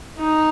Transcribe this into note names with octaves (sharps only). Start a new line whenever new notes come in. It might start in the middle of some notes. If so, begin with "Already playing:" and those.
D#4